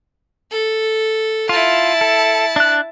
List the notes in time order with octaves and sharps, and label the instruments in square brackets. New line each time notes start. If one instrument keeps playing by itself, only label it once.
[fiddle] A4
[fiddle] E4 A5 [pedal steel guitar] F4
[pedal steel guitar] A4
D4 F#6